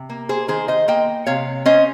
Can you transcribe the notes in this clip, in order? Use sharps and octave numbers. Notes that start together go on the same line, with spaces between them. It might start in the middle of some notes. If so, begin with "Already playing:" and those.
Already playing: C3
A#3
G#4 C5
D#3 G#4 C5
C5 D#5
A#3 D#5 G5
C3 C#5 F5
C#4 C5 D#5